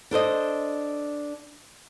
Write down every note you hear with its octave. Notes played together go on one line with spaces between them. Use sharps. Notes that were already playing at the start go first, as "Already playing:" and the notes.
D4 A4 C5 D#5